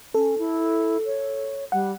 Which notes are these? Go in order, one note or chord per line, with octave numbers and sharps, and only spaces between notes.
C#4 A4
E4
C#5
G3 F#5